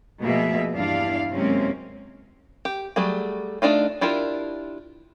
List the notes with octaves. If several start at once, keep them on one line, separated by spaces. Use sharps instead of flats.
B2 F3 A3 A#3 G#4 E5
E2 G2 D4 E4 F5
F#2 C3 G#3 A#3 C4 C#4
G4
F#3 G3 A3 G#4
A3 A#3 D4 D#4 F4
D4 E4 F4 G4 A#4